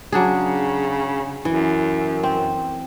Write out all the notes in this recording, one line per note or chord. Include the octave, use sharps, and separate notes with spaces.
C#3 F#3 D4 G#4
F#2 E3
C4